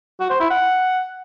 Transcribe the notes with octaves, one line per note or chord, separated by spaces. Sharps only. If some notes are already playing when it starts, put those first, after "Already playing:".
F#4
C5
E4
F#5